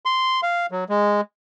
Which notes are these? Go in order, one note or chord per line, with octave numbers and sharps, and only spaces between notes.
C6
F5
F#3
G#3